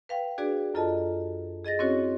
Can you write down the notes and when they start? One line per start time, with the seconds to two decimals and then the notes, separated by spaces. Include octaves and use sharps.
0.09 B4 F5 G5
0.38 D4 F#4 G#4 B4 D5
0.74 F#2 F4 A4 D#5 A5
1.65 G#4 D#5 A6 A#6
1.79 C4 C#4 E4 F#4 C#5